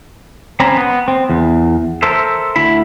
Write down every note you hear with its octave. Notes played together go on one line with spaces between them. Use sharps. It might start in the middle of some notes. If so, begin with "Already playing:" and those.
C4 C#4 C5 A#5 B5
B3
C4
E2
A4 A#4 C5 E5
D2 E4 B5